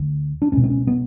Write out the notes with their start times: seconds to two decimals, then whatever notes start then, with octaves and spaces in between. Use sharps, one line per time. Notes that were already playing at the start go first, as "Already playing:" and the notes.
Already playing: D2
0.42 D4
0.52 C#2 B2 C#4
0.64 C4
0.70 C#4
0.87 B3